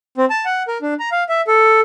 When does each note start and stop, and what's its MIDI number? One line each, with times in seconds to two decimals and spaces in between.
0.18 0.25 60
0.30 0.45 81
0.45 0.63 78
0.68 0.78 70
0.82 0.94 62
1.00 1.09 82
1.12 1.24 77
1.29 1.41 76
1.47 1.80 69